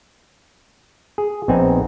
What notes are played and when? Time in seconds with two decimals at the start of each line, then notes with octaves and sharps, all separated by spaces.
1.18 G#4
1.48 A#1 B3 C4 D#4 G#5